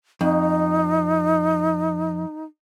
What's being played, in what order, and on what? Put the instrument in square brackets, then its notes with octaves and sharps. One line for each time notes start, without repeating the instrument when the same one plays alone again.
[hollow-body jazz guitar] F2 [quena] D#4